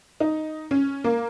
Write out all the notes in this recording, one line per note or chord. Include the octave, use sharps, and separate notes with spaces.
D#4
C#4
A#3